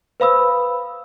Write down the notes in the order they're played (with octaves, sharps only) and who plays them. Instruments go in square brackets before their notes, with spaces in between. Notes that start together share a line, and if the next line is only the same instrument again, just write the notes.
[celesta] B4 C5 F5 B5 D#6 E6